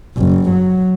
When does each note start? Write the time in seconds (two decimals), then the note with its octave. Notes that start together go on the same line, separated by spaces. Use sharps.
0.17 F#1
0.50 F#3